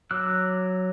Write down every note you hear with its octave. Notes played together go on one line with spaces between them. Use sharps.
F#3 D6 E6 F#6